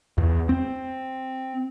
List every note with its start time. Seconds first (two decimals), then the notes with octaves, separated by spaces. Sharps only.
0.18 E2
0.49 C4